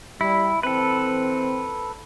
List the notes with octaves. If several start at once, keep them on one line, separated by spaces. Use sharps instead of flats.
G3 E4
E3 C4 A4 B4